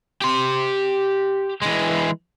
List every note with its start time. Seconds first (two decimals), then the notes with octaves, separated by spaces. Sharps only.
0.22 G4 C6
1.62 E3 G#3